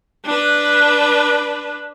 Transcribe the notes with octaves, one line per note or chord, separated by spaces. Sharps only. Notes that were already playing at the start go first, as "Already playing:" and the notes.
D4 B4